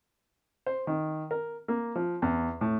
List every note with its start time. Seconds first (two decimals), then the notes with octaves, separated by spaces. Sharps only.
0.66 C5
0.87 D#3
1.31 A#4
1.68 A#3
1.96 F3
2.22 E2
2.61 A2